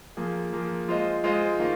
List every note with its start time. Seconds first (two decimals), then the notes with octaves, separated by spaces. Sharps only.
0.17 F3 A#3 G#4
0.53 F3 A#3 G#4
0.88 G#3 F4 C5 D#5
1.24 G#3 F4 C5 D#5
1.59 D#3 A#3 F4